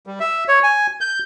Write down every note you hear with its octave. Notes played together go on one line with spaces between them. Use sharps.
G3
E5
C#5
G#5
G6